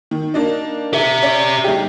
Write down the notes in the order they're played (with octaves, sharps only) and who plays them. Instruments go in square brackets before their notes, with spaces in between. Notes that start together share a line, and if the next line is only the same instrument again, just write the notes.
[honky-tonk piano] D#3
A#3 D4 D#4
[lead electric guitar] G4 E5
[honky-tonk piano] C#4 C#5 D5
G1 D#4 G4